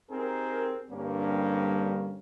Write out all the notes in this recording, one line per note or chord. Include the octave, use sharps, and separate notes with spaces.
C4 D#4 G4 G#4 A#4
G2 D3 G3 A#3 C4 C#4